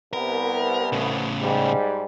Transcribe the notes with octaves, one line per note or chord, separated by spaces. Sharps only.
C2 B3 A#4
A2 C#3
G#2 G3